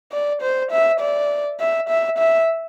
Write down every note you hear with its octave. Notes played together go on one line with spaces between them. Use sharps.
D5
C5
E5
D5
E5
E5
E5